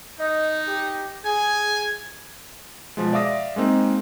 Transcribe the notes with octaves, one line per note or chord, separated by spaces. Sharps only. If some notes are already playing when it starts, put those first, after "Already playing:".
D#4 D#5
G4
G#4 G#5
B2 F3 G#3
D5 E5 F5 D6 D#6 A#6
G#3 A#3 C4 D#4